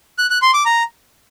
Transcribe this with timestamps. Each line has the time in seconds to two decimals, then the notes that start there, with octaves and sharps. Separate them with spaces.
0.18 F#6
0.30 F#6
0.42 C6
0.54 D6
0.66 A#5